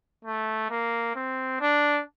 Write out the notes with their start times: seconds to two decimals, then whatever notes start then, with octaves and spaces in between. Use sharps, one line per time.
0.25 A3
0.70 A#3
1.15 C4
1.61 D4